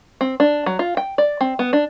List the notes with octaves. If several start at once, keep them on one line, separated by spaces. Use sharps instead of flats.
C4
D4
F#3
F4
G5
D5
C4
B3
D4